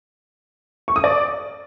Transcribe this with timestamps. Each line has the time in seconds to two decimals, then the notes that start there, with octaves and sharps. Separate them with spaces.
0.88 C#6
0.96 D#6
1.04 D5